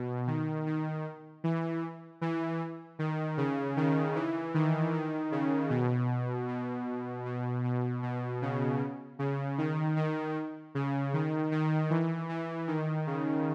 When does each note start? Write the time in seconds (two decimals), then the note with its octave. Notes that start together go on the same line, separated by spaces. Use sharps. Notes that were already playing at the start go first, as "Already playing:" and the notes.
Already playing: B2
0.27 D#3
0.67 D#3
1.44 E3
2.21 E3
2.99 D#3
3.37 C#3
3.77 D#3
4.15 E3
4.54 D#3
4.93 D#3
5.32 C#3
5.70 B2
6.48 B2
7.25 B2
7.64 B2
8.03 B2
8.42 C#3
9.19 C#3
9.58 D#3
9.96 D#3
10.75 C#3
11.13 D#3
11.52 D#3
11.90 E3
12.29 E3
12.68 D#3
13.07 C#3